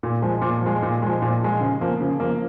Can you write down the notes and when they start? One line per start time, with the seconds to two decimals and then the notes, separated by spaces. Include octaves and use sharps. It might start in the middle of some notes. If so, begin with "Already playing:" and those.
0.03 A#2
0.22 F3 G#3
0.42 A#2
0.62 F3 G#3
0.82 A#2
1.02 F3 G#3
1.22 A#2
1.41 F3 G#3
1.60 C#3
1.81 F3 A#3
2.00 C#3
2.20 F3 A#3